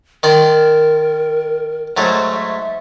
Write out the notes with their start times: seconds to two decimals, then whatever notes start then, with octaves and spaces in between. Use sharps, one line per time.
0.23 D#3 A#4 D5 C6
1.97 G#2 F#3 A3 C5
2.31 E5